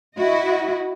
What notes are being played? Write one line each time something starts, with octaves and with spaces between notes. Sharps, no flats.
E4 F#4 D#5